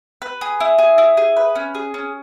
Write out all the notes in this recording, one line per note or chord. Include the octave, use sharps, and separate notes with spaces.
B4
G#4
E4
G#4
E4
G#4
B4
C#4
G#4
C#4